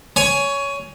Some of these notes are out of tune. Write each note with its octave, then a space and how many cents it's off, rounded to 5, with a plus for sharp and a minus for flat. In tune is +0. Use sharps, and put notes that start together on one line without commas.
C#5 +15 G#5 +10